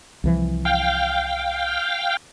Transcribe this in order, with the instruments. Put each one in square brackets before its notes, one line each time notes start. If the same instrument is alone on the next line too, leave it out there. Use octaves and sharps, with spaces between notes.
[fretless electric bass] C2 E3 F3
[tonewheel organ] F5 G5